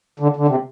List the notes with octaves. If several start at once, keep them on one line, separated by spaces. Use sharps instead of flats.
D3
D3
C3